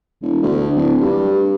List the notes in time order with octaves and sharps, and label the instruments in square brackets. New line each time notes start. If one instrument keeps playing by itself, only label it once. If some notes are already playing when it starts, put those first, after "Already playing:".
[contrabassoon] E1
D2
D1
G2